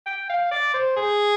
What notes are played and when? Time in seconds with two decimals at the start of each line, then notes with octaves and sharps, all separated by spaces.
0.06 G5
0.30 F5
0.51 D5
0.74 C5
0.96 G#4